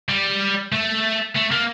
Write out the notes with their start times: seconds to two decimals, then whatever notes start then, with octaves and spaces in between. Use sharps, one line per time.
0.09 G3
0.72 A3
1.36 A3
1.52 A#3